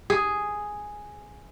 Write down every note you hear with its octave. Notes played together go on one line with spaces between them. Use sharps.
G#4